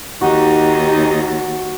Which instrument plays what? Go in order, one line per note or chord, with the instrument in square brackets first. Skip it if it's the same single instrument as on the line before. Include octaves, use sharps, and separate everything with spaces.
[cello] D#2 [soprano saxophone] D#4 [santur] F#4 [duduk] G4